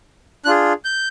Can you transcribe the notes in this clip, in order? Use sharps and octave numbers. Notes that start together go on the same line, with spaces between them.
D4 F4 G#4 F#6
G6